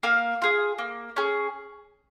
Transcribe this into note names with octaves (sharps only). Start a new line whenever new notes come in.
A#3 F5
F4 G#4
A#3
C#4 G#4